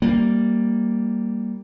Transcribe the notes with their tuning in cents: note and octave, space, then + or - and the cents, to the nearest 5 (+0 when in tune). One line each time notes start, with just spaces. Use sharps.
G3 +0 A#3 +0